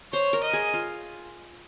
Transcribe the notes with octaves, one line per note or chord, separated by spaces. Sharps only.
C5 C#5
A#4
D#5
G#4
F4